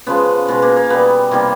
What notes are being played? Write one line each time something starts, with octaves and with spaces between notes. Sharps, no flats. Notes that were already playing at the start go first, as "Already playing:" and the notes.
C#3 F3 G#3 B3
B2 G#3 B3
A#3
A#3
B2 G3 B3
C3 D#3 G3 A#3